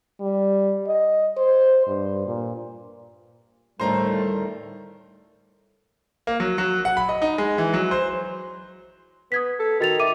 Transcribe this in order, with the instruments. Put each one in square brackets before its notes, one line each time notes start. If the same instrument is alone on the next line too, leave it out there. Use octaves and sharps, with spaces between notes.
[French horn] G3
D#5
C5
G2
A#2
[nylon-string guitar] D2 A2 D#3 [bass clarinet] G3 [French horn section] A3 [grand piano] C5 A#5
[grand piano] A#3
F#3
F#3
F#5
B5
D#5
D#4
G#3
E3
F#3
C5
[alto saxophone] B3 [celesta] D#6 G#6 B6
[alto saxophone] A4
[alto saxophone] D#3 [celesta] F#4 A6 F7
[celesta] E5 D6 D#7